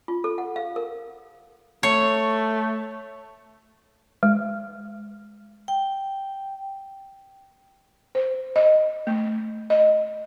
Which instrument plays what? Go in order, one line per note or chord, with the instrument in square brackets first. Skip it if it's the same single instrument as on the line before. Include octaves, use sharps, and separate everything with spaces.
[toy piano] F4
A4
F#5
F5
A#4
[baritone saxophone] A3 [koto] C#5
[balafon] G#3
[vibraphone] G5
[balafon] C5
D#5
A3
D#5